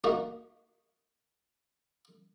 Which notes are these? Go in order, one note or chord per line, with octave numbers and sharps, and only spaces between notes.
A#3 D#4 F#4